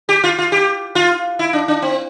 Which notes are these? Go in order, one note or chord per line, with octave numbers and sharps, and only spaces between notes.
G4
F4
F4
G4
F4
E4
D4
D4
C4